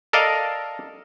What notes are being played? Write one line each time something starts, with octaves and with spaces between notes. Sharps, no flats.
A4 A#4 D5 D#5 F5